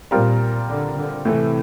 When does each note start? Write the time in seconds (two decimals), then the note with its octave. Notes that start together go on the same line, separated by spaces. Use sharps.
0.11 A#2 G3 C4 F4 A#4
0.68 D3
0.97 D3
1.25 A2 C3 E3 A3